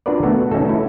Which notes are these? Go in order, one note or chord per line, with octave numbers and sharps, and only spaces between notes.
D4 F4 F#4 A#4 B4 D5
A3 B3 F#4 A4
C#4 D#4 F#4 A4
A3 E4